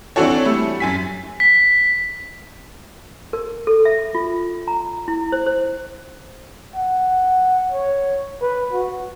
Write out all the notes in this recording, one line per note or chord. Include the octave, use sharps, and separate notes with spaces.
E3 C4 D4 F#4 A4 C#5
G3 A3 E4
F#2 G#5 B6
B6
A#4
A4
E5
F4
A#5
E4
C5
C5
F#5
C#5
B4
F#4